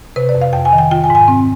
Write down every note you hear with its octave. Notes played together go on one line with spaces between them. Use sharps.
C3 B4
D5
F2
F5
F2 G5
G#5
D#3
G5
F4 G5
G#5
G#2
G#5
C4